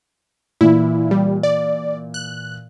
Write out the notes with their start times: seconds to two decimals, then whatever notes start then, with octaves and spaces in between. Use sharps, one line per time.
0.61 A#2 E3 E4
1.11 G3
1.43 D5
2.14 F#6